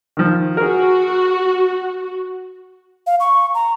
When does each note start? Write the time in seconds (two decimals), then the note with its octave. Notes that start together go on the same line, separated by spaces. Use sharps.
0.17 D#3 F3
0.57 F#4 G#4 A#4
3.07 F5
3.20 C#6
3.55 A#5